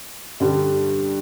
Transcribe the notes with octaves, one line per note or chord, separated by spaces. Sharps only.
G2 D3 G3